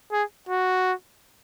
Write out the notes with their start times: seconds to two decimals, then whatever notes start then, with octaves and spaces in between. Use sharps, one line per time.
0.12 G#4
0.49 F#4